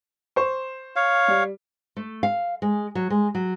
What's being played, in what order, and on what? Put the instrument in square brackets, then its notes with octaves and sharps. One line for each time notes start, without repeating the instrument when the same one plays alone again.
[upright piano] C5 C#6
[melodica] C#5 F5
[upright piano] G3
[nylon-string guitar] A3
F5
G#3
F#3
G#3
F#3